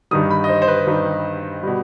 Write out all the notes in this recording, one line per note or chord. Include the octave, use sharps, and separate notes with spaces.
G2 D#3 G3 D#6
B5
D#5
C5
C5
B4
G2 D#3 G3
B2 G3